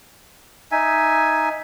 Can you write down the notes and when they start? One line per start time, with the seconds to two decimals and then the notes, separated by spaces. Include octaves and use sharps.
0.72 D#4 E5 G#5